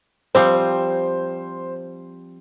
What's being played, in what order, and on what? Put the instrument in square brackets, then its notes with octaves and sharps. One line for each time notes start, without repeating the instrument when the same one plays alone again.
[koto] F3 G3 C4 [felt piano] C5